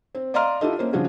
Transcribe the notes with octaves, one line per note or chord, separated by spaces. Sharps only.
C4
D5 D#5 F5 A#5 C6 F6
D4 E4 F4 G4 A4 D#5
A#3 C#4 C5
C#3 F3 D4 F4 F#4 G#4